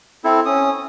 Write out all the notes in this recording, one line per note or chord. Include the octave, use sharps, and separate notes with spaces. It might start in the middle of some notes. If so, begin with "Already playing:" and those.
C4 E4 A4
C#4 D#6